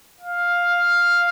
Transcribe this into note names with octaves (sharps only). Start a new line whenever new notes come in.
F5